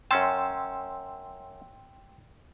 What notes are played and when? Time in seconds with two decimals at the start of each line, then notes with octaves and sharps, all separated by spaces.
0.11 F#2 C#4 G5 A5 C6 E6